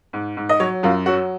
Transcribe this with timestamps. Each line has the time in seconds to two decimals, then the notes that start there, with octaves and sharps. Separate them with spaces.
0.13 G#2
0.37 G#2
0.49 D#5
0.60 F#3 C#5
0.83 F#2 F4
1.06 F#3 F#4